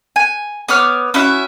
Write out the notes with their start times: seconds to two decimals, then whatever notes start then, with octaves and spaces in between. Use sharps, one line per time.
0.16 G#5
0.68 B3 C#5 D6 F6
1.14 C#4 E4 F#4 E5